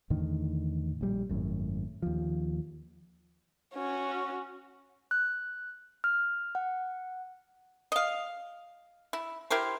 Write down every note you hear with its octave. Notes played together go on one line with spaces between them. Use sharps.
E2 A2 D3 D#3
A#1 G3
G#1 F#2 A2
D#2 F3
C#4 F#4
F#6
F6
F#5
D#5 F5
E4
E4 G4 A#4 C5